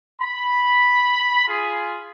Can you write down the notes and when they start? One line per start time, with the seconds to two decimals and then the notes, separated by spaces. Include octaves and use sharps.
0.21 B5
1.47 F4 G#4